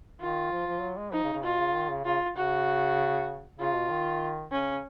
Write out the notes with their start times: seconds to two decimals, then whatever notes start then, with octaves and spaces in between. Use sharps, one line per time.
0.20 D#3 F4
0.52 F3
0.67 F3
0.81 F#3
0.97 G#3
1.13 F3 D#4
1.23 C#3
1.34 C#3
1.43 B2 F4
1.59 C#3
1.74 D#3
1.89 C#3
2.04 C#3 F4
2.36 C#3 F#4
3.58 C#3 F4
3.74 B2
3.90 D#3
4.52 C#3 C#4